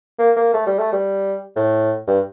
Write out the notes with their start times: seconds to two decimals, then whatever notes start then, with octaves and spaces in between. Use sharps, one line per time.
0.19 A#3
0.37 A#3
0.54 A3
0.67 G3
0.79 A3
0.92 G3
1.56 A2
2.07 G2